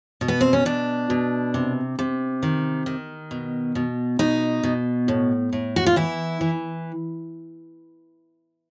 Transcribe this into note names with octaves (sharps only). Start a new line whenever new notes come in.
B2
B3
C4
C#4
B2 D4
B2
C3
C3
D#3
D#3
B2
B2
B2 D#4
B2
A2
A2
F#4
F4
E3 E4
E3